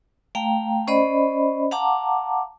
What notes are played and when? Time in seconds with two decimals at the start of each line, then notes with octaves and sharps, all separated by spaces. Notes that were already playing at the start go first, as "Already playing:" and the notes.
0.35 A3 F5 G5 A#5
0.87 C#4 C5 D5 D#5 B5
1.71 F5 F#5 A5 A#5 D6